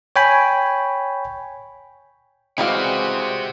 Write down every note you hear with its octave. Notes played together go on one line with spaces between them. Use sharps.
C#5 G5 G#5 B5
C3 E3 G3 G#3 C4 F#4 F5